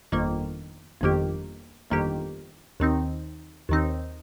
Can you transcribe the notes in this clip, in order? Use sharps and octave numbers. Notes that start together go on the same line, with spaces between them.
G1 F2 D#3 A#3
G1 F2 D#3 A#3 G4
G1 F2 D#3 A#3 G4
D#2 D#3 C4 D#4
D#2 D#3 C4 D#4